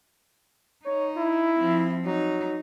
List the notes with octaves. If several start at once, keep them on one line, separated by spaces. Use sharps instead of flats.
D#4 C#5
E4
F3 C4
F#3 D#4